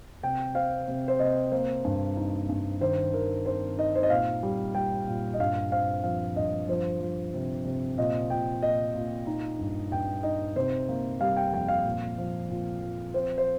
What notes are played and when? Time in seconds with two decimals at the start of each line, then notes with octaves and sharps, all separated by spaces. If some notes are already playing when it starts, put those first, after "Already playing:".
0.23 C3 G5
0.55 C4 F5
0.88 C3
1.08 C5
1.19 C3 D#5
1.52 A#3 C5
1.85 G2
2.17 D#4
2.49 G2
2.81 D#3 C5
3.13 D#3 A#4
3.46 C4 C5
3.78 D#4 D#5
3.95 C5
4.03 D#5
4.10 A#2 F5
4.43 G3
4.74 G3 G5
5.08 A#2
5.34 D#5
5.39 G2 F5
5.72 C4 F5
6.04 F3 F5
6.36 G2 D#5
6.68 F3 C5
7.01 F3
7.34 C3
7.65 C3
7.98 A#2 D#5
8.30 A#2 G5
8.62 A#2 D#5
8.95 A#2
9.27 D#4
9.59 G2
9.91 G2 G5
10.23 D#4 D#5
10.56 C3 C5
10.89 A#3
11.21 G3 F5
11.36 G5
11.53 F2 G5
11.68 F5
11.85 A#2
12.18 F3
12.50 A#2
12.82 F3
13.14 C4 C5
13.38 C5